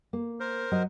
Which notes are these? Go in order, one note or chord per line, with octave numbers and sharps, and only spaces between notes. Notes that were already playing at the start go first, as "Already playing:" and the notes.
A#3
A#4 C5
F#3 F#4 D#5